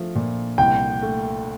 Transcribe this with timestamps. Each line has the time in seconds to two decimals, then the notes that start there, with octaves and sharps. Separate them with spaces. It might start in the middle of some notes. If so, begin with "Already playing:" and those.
Already playing: F3 A3
0.15 A#2
0.58 C2 G5
1.02 A3